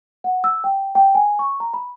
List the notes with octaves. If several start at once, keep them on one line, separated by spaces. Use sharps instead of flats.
F#5
E6
G5
G5
G#5
C#6
A#5
B5